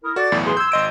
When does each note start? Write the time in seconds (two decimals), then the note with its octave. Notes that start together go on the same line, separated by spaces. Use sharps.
0.04 E4 A#4 D#6
0.16 F#4 A4 D5 A6
0.32 B1 E2 A2
0.45 E3 G#4 C6
0.57 E6 G6 G#6
0.72 G#1 D#5 C6 D7